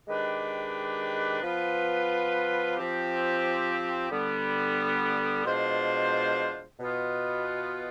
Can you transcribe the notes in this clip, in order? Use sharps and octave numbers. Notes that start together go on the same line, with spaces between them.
D#3 G#3 D4 G4 B4
F3 B3 F4 B4
F3 C4 G4
D3 G3 B3
B2 G#3 D4 F4 C5
B2 B3 F4